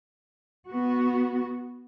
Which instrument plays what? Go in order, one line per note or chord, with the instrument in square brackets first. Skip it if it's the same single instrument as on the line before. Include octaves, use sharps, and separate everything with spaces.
[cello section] B3 F#4